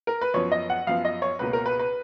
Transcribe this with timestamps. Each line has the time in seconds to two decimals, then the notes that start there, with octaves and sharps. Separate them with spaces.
0.07 A#4
0.21 B4
0.34 F#2 F3 B3 C#5
0.52 D#5
0.70 F#5
0.87 F#2 F3 B3 F5
1.05 D#5
1.22 C#5
1.39 C#2 B2 A#3 B4
1.53 A#4
1.66 B4
1.79 B4